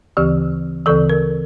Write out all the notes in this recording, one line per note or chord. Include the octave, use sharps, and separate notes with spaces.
D2 C#3 E3 G4
D2 C#3 E3 A4
A#4